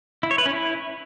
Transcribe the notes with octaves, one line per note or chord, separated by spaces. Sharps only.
E4
C#5
B4
C#4
E4